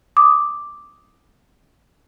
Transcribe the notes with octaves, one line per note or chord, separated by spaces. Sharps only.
D6 D#6